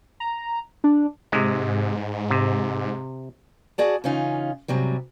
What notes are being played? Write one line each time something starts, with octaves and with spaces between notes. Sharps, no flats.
A#5
D4
G#2 C3 G#3
C3
F#4 G#4 D5 A5
C#3 E3 C#4 D#4 F4
G#2 C3 F#3 G3